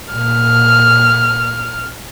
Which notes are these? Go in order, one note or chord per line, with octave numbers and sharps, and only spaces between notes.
A#2 F6